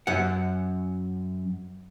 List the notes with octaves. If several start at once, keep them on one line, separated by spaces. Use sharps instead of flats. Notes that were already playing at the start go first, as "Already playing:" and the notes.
F#2 F#5